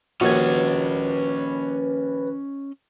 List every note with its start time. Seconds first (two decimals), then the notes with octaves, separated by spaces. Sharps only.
0.21 A#1 D#2 C#4 F#4 B4 D#5 G#5